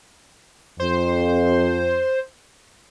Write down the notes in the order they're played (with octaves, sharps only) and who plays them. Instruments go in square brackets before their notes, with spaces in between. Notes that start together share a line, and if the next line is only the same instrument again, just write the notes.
[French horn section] F2 [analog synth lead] C5